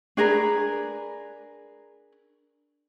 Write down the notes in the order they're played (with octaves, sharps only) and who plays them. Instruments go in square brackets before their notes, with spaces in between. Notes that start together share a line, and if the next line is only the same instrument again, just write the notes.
[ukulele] D4 G#4 A#4 B4